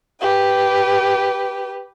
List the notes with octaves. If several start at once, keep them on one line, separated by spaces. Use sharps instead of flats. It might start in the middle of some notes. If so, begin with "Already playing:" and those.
G4 B4